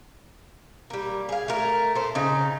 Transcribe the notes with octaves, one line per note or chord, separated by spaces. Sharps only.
G3 A#3
G#4 F5
A3 A#4
A4 C5
C#3 D#4